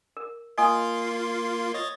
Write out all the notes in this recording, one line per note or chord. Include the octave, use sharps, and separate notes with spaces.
A#4
A#3 F4 D#5 G#5 C6 D#6
C#5 D#5 A6